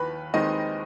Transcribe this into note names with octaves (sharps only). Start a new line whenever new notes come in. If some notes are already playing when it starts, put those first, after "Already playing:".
Already playing: D#2 D#3 B4 B5
D#2 D#3 G#3 C4 D#4 D#5